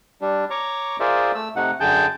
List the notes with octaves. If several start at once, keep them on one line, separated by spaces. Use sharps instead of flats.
G3 D4
C#5 A#5 C#6 D6
F4 G#4 A#4 C5 D5 E5
A3 E6
C3 A3 D#4 F#5
F#2 D3 G#4 G5 A5 G6